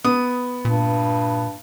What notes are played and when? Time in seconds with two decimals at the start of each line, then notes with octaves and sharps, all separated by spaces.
0.04 B3 D#6
0.65 G2 A#2